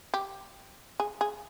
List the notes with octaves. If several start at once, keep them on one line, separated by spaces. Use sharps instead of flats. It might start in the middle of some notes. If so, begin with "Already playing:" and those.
G4
G#4
G#4